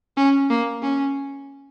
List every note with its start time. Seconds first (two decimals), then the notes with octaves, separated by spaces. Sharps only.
0.17 C#4
0.50 A#3
0.82 C#4